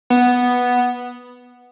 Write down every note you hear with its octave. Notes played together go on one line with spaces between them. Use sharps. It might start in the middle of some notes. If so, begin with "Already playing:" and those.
B3